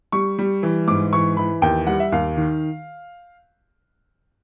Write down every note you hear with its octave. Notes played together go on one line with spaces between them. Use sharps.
G3 C#6
G3
E3
G#2 D6
E3 C#6
E3 B5
D#2 G5
G3 F#5
E5
D#2 F5
D#3